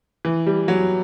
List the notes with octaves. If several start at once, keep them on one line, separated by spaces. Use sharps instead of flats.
E3
G3
F#3